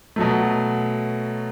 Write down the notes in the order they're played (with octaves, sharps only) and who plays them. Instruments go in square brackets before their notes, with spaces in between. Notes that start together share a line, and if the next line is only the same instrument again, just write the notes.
[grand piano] B2 F#3 A3